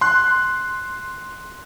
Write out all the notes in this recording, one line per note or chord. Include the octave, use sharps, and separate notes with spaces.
C6 F#6